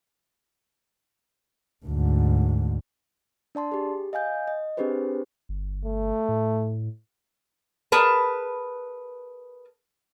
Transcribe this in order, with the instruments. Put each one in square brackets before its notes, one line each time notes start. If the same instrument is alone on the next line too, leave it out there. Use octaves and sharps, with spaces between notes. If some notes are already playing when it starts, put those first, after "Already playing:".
[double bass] D2 G#2
[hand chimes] D4 D5 A5 C6
G4 G#4
D#5 F5 G#5 G6
D#5
C4 D4 G4 G#4 B4 C5
[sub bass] G1
[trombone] A3
[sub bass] A2
[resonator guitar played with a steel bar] G#4 A#4 B4 A5